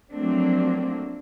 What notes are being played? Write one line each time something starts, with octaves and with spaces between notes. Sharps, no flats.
F3 F#3 A3 A#3 C4 D4